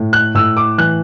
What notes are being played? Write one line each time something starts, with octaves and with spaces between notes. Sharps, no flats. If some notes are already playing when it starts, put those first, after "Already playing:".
Already playing: A2
F#6
A2 E6
D6
E3 F#6